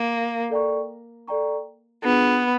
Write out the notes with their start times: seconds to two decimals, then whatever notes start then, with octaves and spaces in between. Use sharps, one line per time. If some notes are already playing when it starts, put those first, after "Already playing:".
Already playing: A#3
0.50 A4 D5 G5 A#5 C#6
1.28 A4 D5 G5 A#5 C#6
2.04 B3 D4 F4 G#4 B4